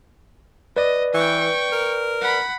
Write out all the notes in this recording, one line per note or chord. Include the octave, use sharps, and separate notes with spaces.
B4 D5 D#5
E3 G5 C#6
A#4
F#5 B5